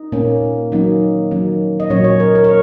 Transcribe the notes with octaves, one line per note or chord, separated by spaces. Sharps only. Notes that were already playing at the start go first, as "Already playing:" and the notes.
Already playing: D#4
A#2 A#3 C#4
D#3 F#3 A#3 C#4 D#4
D#3 F#3 A#3 C#4
D#5
A#2 F#3 C#4 C#5
C#5
A#4
A#4
C#5